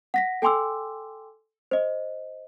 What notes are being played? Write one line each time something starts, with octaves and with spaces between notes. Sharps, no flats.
F#5 A#6 B6
A4 G5 G#5 C6 D6 E6
C5 D#5